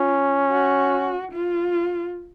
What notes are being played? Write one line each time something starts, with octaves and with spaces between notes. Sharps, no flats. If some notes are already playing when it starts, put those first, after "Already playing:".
Already playing: C#4 F4
F#4
F4